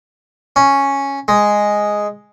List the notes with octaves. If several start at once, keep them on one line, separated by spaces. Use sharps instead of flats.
C#4
G#3